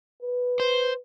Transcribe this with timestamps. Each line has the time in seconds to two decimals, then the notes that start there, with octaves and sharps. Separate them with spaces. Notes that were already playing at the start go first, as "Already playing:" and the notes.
0.22 B4
0.60 C5